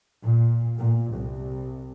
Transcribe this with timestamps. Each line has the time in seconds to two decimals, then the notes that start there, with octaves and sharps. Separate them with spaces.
0.23 A#2
0.78 A#2
1.14 C2